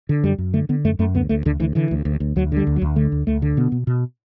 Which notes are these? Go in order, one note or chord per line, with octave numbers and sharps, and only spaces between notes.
D3
F#2 G3
F#2
D3 A3
D3 B3
F#2 A3
F#2 A3
D2 B3
D2 A3
D2 D3
D2 E3
D3 E3
D2
D2
D2
D2 F#3
D3 G3
D2
F#3
D2
D3 A3
D2
D2 A3
D3
B2 B3
B2
B2